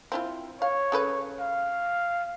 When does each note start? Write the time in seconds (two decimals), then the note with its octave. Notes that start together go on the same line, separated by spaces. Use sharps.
0.12 C4 E4 F4
0.62 C#5 F5
0.92 C#3 A4 B4
1.40 F5